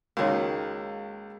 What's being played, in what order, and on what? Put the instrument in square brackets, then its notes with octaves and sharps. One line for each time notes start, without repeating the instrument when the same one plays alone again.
[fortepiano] C#2 D#3 [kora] G#3 A#3 [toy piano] F#4 C#5